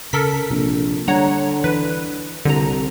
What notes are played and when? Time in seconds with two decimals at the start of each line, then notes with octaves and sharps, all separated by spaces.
0.13 C#3 A4 A#4 B6
0.50 A#1 C3
1.08 D3 G3 C#5 F#5 A#5
1.64 E3 B4
2.45 C2 D3 A#5